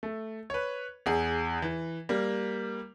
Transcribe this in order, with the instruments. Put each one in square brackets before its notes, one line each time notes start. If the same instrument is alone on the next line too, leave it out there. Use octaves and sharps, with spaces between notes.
[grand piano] A3
B4 C#5
E2 G#4
E3
G3 A#3